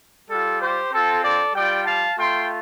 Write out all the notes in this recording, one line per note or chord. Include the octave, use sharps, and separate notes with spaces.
G3 F4 A4
G4 C5
C4 F4 A4
A4 D5
G3 F4 D5 G5
F5 A5
A3 F4 G5 C6